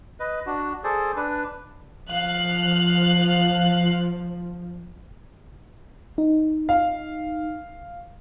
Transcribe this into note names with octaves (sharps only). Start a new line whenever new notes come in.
B4 D#5
D4 F#4
G#4 A4 C5 D5
D4 B4
F3 F5 F#6
D#4
F5